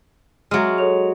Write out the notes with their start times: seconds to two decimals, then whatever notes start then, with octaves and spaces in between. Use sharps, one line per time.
0.51 F#3 G#3 E5 F6
0.78 A4 C#5 F7